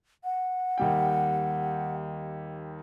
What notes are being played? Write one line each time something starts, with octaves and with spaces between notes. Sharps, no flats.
F#5
D#2 G3 G5